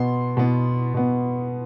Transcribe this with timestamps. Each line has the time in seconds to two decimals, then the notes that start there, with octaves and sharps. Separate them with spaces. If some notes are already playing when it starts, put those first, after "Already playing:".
Already playing: B2 B3 C6
0.37 B2 B3
0.94 B2 B3